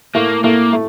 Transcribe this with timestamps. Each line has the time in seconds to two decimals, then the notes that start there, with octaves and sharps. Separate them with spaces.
0.15 A2 A3 A#3
0.44 A2 A3 A#3
0.73 A3